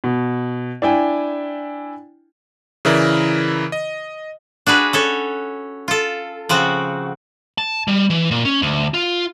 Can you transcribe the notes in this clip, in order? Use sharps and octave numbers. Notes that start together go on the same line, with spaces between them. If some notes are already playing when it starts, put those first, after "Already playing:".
B2
D4 E4 G5 G#5
C#3 E3 E4 A#4 D5
D#5
D4 F#4 G#4 B4
C#4 A4 C#5
F4 A4
C#3 F3 C4 F#4
A5
G3
E3
A#2
C#4
D2
F4